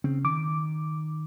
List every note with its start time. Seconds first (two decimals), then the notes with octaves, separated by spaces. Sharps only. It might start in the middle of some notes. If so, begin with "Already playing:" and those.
0.04 C#3 C4
0.25 D#3 D6